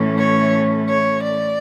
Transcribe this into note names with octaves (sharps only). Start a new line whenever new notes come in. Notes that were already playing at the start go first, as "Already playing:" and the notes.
Already playing: A2 E3 A3 C#4
C#5
C#5
D5